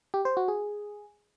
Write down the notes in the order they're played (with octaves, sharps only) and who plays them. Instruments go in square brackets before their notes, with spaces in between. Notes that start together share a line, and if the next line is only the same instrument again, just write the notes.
[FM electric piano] G4
C5
F#4
G#4